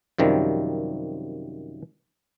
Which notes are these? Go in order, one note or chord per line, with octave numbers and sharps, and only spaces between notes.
F#2 C3 D#3 F3 G3